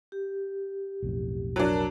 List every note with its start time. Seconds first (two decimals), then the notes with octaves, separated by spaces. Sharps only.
0.12 G4
1.03 B1 F2 A2
1.56 F#3 D4 F#4 A#4 A5